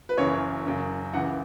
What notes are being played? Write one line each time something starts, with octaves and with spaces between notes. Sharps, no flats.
B4
F#1 F#2 C#3 E3 C#5
F#1 F#2 C#3
C#2 C#3 E3 F#5